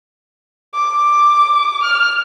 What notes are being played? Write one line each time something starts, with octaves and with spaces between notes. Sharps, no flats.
D6
F6